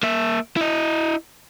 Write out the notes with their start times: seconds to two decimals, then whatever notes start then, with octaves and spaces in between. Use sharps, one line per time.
0.03 A#3 E5
0.56 E4 D#5